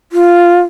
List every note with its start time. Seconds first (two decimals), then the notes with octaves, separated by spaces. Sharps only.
0.12 F4